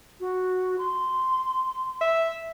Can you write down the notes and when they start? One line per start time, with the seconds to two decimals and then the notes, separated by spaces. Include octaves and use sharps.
0.20 F#4
0.78 C6
2.01 E5